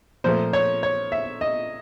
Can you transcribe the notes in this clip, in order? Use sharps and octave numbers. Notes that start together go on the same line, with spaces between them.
A#2 F3 A3 C5
C#5
C#5
E5
D#5